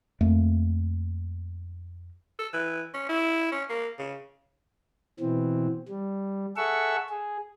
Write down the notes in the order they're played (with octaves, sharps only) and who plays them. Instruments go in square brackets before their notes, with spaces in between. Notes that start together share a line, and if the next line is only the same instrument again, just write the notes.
[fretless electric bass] F2 A3 A#3
[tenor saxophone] A4
E3
C#4
E4
C#4
A#3
C#3
[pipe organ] B2 E3 C4
G3
G#4 A4 E5 F#5 C#6 E6
G#4